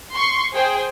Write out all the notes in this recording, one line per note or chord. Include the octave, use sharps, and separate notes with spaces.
C6 C#6 C7
G#4 C5 G5